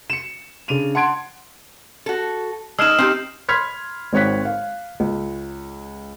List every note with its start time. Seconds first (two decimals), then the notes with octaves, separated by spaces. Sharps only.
0.10 C#7 E7
0.68 C#3 D4 D#7 F7
0.95 F#5 A5 C6 G#6 D7
2.06 F#4 A4
2.79 G#3 D#4 E6 F6 E7
2.98 C4 D#4 G4
3.49 B5 C6 F6 G#6 B6
4.13 G#1 C4 C#5 F#6 B6
4.45 F5
5.00 C#2